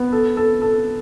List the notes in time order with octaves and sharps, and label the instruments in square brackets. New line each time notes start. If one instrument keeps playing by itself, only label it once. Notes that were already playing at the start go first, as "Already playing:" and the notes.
Already playing: [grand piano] B3
A4
A4
A4